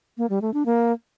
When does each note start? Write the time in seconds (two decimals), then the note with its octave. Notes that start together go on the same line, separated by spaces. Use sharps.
0.18 A#3
0.30 G3
0.42 A3
0.54 D4
0.66 A#3